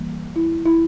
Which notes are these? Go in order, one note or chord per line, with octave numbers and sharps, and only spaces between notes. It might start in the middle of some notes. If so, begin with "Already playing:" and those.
Already playing: E3 G3 A#3
E4
E4